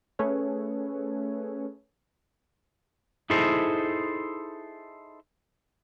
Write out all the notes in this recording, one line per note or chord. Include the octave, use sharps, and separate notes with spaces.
A3 C#4 G#4 A4 B4 C#5
D#4 E4 G#4 A4 C5